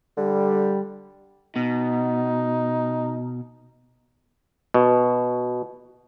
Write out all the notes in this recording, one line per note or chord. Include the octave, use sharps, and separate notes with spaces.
D3 G3
B2 D#4
B2